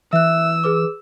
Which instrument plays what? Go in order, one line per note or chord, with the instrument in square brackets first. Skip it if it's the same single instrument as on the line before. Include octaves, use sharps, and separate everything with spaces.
[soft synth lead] E3 [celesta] E5 F#6 [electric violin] E6
[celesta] G#4 B4 D6